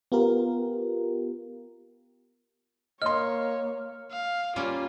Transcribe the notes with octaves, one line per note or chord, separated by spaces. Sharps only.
B3 F4 G4 A#4
A#3 C#5 D#5 C6 F6
F5
G3 A#3 C#4 F4